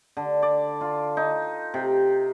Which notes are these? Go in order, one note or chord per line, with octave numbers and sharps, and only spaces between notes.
D3
D5
F4
D#4
C3